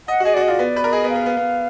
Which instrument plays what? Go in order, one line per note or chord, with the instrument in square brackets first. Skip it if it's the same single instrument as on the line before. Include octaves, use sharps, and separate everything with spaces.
[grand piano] D#5 [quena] F#5
[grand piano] F#4
[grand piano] G#4 [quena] D#5
[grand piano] F#4 [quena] D5
[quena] D#5
[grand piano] F4 [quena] D5
[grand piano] B3
B4
A#4
[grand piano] G#4 [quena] D#5
[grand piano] B3
[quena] F5
[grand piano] B3
B3
B3